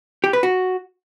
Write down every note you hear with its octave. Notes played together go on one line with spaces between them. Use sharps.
G4
B4
F#4